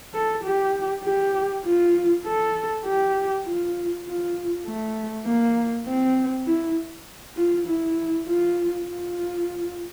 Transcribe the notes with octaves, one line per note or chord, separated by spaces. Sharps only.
A4
G4
G4
F4
A4
G4
F4
F4
A3
A#3
C4
E4
F4
E4
F4
F4